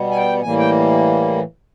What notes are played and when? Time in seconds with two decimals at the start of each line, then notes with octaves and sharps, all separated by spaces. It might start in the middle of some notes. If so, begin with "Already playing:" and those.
Already playing: B2 G3 B3
0.11 G#5
0.16 G5
0.42 A2 E3 G3 A#3 G#5
0.58 G5